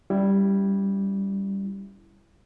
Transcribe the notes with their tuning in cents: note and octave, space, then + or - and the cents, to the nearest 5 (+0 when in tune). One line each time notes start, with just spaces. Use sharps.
G3 +0 C#4 +40 E4 +10